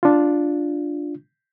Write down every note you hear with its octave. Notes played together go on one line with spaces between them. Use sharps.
D4 F4